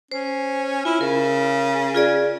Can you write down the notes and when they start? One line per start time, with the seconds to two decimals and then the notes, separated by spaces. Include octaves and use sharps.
0.12 C#4 C5
0.85 E4 F4
1.01 C#3 A#4
1.95 F4 G#4 D5